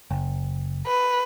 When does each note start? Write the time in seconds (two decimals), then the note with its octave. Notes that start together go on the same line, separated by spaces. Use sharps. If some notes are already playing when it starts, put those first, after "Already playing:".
0.11 F#1
0.86 B4